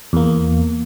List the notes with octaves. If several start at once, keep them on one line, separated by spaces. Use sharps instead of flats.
E2 A#3